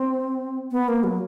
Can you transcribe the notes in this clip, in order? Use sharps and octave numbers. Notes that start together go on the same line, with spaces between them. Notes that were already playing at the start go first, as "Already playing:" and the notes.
Already playing: C4
B3
A#3
F#3